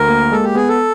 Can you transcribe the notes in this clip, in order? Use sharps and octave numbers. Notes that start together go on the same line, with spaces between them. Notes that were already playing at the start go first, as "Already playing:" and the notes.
Already playing: D2 A#4
A#3
G#3 A4
G4
B3 G#4
A4